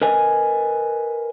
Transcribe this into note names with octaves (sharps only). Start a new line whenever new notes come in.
A#4 B4 D#5 G#5